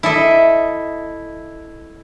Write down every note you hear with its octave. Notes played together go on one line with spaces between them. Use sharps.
E4 A4 D#5